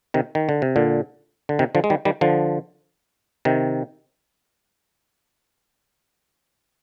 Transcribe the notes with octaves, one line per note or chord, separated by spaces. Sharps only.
C3 D#3
D#3
D3
C3
A#2 D3
D3
C3 D#3
D3 F3
G#3
D#3 G3
D#3 G3
D3 F3
C3 D#3